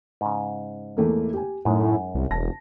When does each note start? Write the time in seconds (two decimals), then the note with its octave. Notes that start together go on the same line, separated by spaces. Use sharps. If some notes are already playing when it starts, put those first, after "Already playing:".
0.21 G#2 C#3
0.97 E2 A3 A#3
1.34 G4 G#5
1.65 F#2 A2 G#3 D#4
2.15 C2
2.31 E1 A5 A#6